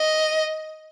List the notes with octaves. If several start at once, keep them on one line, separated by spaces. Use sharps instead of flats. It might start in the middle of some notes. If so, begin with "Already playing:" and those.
Already playing: D#5